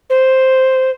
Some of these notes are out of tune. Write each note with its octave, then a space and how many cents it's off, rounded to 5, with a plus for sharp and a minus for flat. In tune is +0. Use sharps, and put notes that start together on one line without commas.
C5 +0